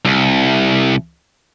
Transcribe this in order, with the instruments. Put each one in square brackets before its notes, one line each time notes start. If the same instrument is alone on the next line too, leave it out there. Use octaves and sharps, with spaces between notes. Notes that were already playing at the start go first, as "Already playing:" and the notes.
[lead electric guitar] C2